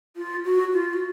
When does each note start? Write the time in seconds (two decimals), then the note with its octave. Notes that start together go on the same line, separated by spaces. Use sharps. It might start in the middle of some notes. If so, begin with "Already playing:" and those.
0.16 F4
0.45 F#4
0.73 F4
0.93 F#4